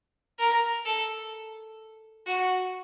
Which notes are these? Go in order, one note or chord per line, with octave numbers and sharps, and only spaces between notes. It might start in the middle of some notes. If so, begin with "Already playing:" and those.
A#4
A4
F#4